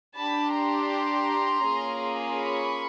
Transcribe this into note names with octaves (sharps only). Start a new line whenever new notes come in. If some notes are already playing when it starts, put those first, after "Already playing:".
D4 G4 A5 B5
A#5 C6
A#3 C#4 F4 G#4
B5 C#6